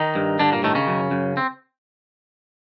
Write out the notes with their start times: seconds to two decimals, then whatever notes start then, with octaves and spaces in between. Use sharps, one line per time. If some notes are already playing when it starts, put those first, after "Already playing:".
Already playing: D#3 D#4
0.15 G2
0.39 G2 D3 D4
0.52 A#2 A#3
0.63 A2 D#3 A3
0.75 C#3 C#4
0.88 F#2
1.11 F#2
1.37 C4